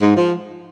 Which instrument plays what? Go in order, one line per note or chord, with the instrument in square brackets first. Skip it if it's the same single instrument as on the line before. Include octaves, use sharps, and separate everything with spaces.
[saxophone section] G#2
F3